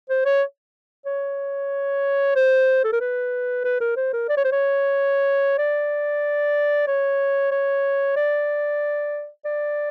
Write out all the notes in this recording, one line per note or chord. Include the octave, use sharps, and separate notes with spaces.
C5
C#5
C#5
C5
A4
A#4
B4
B4
A#4
C5
A#4
D5
C#5
C5
C#5
D5
C#5
C#5
D5
D5